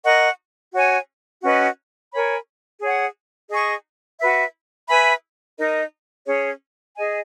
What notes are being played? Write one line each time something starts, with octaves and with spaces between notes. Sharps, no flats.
A#4 D#5 F#5 C#6
F#4 C#5 G#5
C#4 F#4 B4 D#5
A#4 C#5 G#5 B5
G#4 C#5 F#5
G#4 D#5 G#5 C#6
F#4 B4 E5
B4 E5 G#5 B5
D#4 A#4 D#5
C#4 G#4 C#5
G#4 D#5 G#5